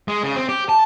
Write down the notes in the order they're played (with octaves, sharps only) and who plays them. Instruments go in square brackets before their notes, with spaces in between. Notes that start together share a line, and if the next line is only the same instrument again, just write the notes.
[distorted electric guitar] G#3
C#3
C4
G4
A5